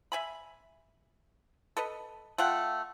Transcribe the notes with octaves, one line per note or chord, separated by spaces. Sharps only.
E5 G#5 B5
A4 B4 D#5
A3 F4 F#5 G5